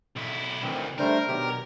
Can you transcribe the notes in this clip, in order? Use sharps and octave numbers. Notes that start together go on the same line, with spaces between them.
B1 E4
D2 D#3 E3 C4
G3 A3 D4 A#4 C5
B2 D#3 F#3 G4